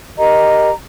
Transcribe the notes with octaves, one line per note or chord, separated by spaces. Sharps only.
G4 A#4 D#5 A#5